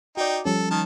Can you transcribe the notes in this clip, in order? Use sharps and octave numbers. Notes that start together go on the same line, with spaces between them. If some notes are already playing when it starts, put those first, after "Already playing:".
D#4 F#4 D5 G5
F3 G3 C#4 A4
D#3 A5